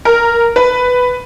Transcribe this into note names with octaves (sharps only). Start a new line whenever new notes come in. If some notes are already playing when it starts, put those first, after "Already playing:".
A#4
B4